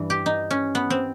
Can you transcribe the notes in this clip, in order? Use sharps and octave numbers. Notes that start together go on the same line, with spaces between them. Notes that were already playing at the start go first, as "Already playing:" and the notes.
Already playing: G2 E3
G4
D#4
C#4
B3
C4